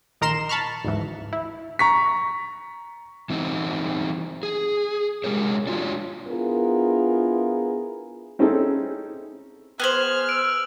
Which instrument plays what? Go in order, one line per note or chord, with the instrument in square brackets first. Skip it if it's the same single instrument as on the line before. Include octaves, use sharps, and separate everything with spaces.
[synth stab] A#1 D#3 A#4 A#5 C6 E7
A5 B5 C#6 F6
G#1 D2 G#2 E3
E4
[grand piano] A#5 C#6 B6
[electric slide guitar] E3 C4 D#4
G#4
G#3 G4 A#4 C#5
D4 F4 F#4 C#5
[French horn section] B3 D4 E4 F4 G#4 A#4
[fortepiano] C4 C#4 D#4 E4 G#4 A4
[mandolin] B3 G#4 C5 [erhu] F6 [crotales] F#6 F#7
[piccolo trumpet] E6 [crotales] D7